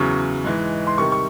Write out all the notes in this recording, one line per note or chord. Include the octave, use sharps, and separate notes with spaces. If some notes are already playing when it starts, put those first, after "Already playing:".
Already playing: E2 C#3 F#3 C#6
G#2 E3 G#3
C6
C3 D#3 G3 C#6
C#6